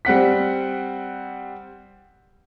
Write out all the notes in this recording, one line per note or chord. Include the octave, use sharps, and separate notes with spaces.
G3 C4 F#5 B6